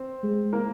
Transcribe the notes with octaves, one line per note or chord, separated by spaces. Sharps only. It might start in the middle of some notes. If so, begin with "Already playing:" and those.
Already playing: C4 C5
G#3
A#3 A#4